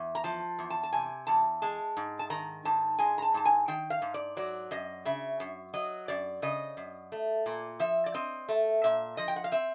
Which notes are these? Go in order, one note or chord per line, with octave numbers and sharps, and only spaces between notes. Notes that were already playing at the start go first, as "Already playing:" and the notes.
Already playing: E2
A#5
F3 A5
E2
A5
A5
C3 G#5
E2 A5
G#3 A5
G#2
A5
D#3 A#5
G#2 A5
G#3 G#5
A#5
A5
G#2 A5
G#5
D#3 G5
F5
G#2
D5
F#3 D5
F#2 D#5
C#3 E5
F#2
F#3 D#5
F#2 D5
C#3 D#5
F#2
A3
A#2
F3 E5
D5
C4 D#5
A3 E5
A#2 E5
F3 D#5
G5
F#5
F5
C4 E5